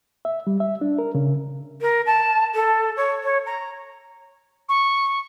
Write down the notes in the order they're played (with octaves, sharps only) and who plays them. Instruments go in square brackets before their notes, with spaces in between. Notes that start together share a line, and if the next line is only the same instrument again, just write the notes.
[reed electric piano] E5
G3
E5
D4
A#4
C#3
[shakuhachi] A#4
A5
A4
C#5
C#5
A#5
[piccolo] C#6